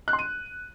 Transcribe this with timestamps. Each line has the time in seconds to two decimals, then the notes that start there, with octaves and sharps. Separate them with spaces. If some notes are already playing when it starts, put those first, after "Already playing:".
0.08 F#6
0.13 C6
0.19 D#7